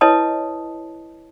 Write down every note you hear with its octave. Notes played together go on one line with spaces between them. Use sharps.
E4 B4 C#5 D#5 A5 D#6